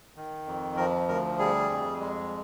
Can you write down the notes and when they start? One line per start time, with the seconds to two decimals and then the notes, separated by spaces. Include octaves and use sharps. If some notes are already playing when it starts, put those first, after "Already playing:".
0.16 D#3
0.46 F2
0.77 F3 A#4
1.08 D2 A#4
1.39 G3 G#4
1.70 F2
2.01 G#3